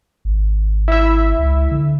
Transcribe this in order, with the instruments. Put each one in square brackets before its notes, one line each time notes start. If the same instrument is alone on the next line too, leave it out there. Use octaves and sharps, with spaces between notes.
[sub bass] G#1
[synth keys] E4 E5
[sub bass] C#2
D3